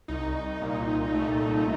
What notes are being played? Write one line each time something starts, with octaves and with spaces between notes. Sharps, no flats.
C2 D#4
C2
A#2
A#2
A3
C2